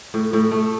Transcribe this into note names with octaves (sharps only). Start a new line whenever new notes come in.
A2
A2
A3